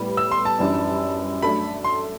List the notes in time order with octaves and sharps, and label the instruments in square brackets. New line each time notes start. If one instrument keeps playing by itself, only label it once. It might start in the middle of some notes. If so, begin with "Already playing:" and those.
Already playing: [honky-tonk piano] A2 G3 B3
[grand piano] E6
C6
A5
[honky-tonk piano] F#2 E3 G3 D4
[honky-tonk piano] F#3 A3 D4 A4 [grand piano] B5
[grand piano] C6